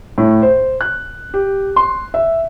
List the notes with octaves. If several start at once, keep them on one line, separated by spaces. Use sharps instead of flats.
A2
C5
F#6
G4
C6
E5